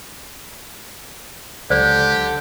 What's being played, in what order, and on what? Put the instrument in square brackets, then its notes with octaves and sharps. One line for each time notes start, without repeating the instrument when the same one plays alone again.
[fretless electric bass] C#2 F#3 [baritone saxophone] D3 [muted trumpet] G4 [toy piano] C5 D5